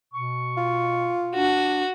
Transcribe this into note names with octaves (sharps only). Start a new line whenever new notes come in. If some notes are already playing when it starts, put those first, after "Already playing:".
B2 C#6
F4
D4 F#4